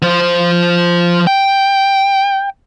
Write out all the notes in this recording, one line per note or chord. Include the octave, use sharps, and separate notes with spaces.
F3 C5
G5